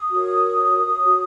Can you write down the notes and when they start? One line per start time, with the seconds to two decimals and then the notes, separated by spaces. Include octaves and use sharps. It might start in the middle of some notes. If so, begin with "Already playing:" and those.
Already playing: D#6
0.11 F#4 A#4 C#5
1.00 F#4 C#5